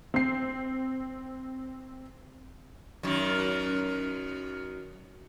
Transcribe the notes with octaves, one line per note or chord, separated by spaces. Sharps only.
C4 C7
F#2 D#3